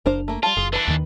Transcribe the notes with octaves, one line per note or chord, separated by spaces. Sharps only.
F#1 D4 A#4 C5 F5
A3 A#3
G3 F4 A5
F#1 G#4
E3 D4 B4 B5
D#2 D#3